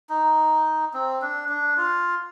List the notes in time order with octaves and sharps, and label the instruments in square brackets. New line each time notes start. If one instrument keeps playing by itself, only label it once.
[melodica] D#4
C4
D4
D4
F4